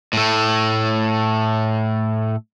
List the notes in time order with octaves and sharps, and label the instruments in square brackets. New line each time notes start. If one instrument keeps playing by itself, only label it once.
[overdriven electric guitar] A2 A3